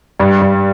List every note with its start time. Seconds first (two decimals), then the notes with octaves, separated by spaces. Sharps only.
0.20 G2
0.41 G2